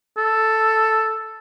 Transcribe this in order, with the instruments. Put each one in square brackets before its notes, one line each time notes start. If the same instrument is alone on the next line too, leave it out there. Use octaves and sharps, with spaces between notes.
[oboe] A4